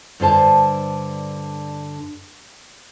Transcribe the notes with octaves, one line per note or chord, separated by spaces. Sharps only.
G2 D3 C5 A5